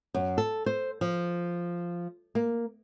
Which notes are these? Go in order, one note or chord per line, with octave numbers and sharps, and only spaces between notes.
F#2
A4
C5
F3
A#3